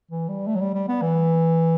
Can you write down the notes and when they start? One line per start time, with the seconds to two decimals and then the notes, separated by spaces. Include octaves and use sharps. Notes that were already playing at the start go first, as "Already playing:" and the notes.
0.11 E3
0.28 G3
0.46 A3
0.55 F#3
0.61 G3
0.74 G3
0.88 B3
1.02 E3